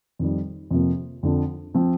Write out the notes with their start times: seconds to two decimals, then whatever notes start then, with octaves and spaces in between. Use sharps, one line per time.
0.19 F2 D#3 G3
0.71 F2 C3 F3 A#3
1.23 F2 D3 F3
1.74 F3 C4 F4